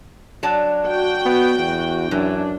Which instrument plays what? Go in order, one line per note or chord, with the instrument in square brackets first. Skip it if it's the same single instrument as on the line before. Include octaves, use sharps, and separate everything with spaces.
[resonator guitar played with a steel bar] F#3 D4 A5
[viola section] F#4 G5
[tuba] B3
E2
[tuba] F#2 [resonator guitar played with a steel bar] E3 [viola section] D4